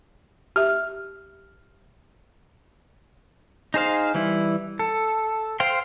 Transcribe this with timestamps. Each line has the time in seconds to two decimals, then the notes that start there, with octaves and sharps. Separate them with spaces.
0.56 G4 E5 F6
3.74 D#4 G#4 C5 F5
4.15 E3 G3 E4
4.79 A4
5.60 C5 F5 G5 C6